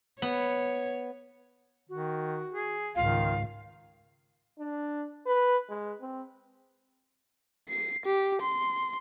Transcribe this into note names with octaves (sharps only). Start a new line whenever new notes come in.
B3 C#5
D#3 F#4
G#4
C#2 G#2 D#3 F4 F5
D4
B4
G#3
C4
C7
G4
C6